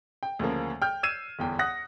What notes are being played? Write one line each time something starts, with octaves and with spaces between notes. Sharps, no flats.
G5
D2 C#3 F3 A#3
G5 F6 G6
E6 G#6 C7 D#7 E7
G1 E2 G5
F#5 D#6 F#6 A#6